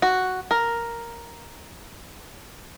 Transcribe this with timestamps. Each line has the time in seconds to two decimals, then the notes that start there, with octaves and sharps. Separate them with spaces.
0.02 F#4
0.51 A#4